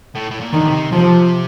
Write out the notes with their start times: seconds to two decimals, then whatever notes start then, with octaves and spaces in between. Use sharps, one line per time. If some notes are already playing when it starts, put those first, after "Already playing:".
0.15 A2
0.30 A2
0.40 A#2
0.53 D3 D#3
0.67 C3
0.91 C3 F3